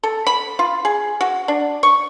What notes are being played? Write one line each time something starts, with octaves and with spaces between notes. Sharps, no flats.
A4
B5
F4
G#4
F#4
D4
C#6